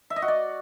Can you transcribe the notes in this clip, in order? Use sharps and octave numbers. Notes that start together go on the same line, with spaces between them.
E5
D#5
F#4
D5